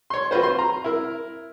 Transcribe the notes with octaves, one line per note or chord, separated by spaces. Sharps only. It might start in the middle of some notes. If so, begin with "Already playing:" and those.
C#5 C6
F4 F#4 B4 C5
C6
A#5
E4 A#4